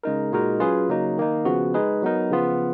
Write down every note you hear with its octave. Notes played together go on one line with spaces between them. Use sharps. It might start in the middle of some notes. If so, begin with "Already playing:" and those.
C#3 G#3 D#4 A#4
A#2 G#3 D#4 F#4 A#4
F#3 C#4 F4 G#4 B4
C#3 F#3 A#3 D#4
D#3 A#3 D#4
C#3 F3 B3 F#4
G#3 D#4 G#4 B4
F#3 B3 D#4 A#4
C#3 F3 B3 F4